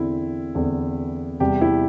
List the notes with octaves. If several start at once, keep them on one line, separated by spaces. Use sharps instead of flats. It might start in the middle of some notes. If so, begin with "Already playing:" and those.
Already playing: E2 D3 C4 E4
E2 D3 C4
E2 C3 G3 G4
E4